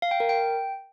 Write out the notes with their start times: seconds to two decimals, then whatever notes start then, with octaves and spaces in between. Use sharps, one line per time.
0.02 F5
0.11 G5
0.20 A#4
0.29 G5